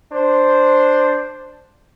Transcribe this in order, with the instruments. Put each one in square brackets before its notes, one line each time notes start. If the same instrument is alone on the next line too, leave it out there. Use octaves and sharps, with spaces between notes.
[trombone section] D4 C5